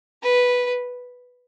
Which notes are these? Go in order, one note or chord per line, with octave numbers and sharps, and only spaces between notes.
B4